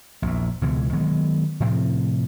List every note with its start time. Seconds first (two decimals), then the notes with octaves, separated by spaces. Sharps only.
0.22 A#1 E2
0.62 C#2 B2 E3 G#3
0.93 D#3 F#3 G#3 B3
1.60 A2 C3 F3 C4